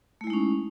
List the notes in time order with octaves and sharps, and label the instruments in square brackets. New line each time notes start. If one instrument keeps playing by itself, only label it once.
[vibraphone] A3
E4
G#3
D#4
C#4